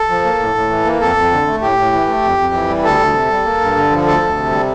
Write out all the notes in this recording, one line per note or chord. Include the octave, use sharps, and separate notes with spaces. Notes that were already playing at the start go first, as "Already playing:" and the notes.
Already playing: A4
F3
A#3
A2
A2
E3
A#3
F2 A4
F2
D3
A3
A2 G4
A2
E3
A3
F2
F2
E3
G3
D2 A4
D2
C3
G3
A#3
G2
D3
F3
D2 A4
D2
C3
G3